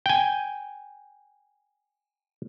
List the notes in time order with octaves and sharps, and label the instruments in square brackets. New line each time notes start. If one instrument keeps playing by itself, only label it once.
[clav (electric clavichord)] G5 G#5